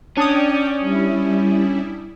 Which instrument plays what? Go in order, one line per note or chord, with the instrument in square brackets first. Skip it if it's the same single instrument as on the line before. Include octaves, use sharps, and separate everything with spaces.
[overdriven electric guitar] C#4 [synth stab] D4 D#6 [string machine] D5 G5
[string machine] G3 E4